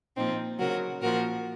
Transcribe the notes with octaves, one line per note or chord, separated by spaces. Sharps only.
A#2 F3 C4 D#4
C#3 F#3 F#4 A#4
A#2 F3 F#4 A#4